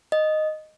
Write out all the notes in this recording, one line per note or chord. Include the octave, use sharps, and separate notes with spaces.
D#5